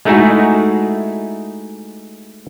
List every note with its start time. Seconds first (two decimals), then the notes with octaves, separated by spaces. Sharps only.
0.05 G#3 A3 D#4 E4 F#4 G#4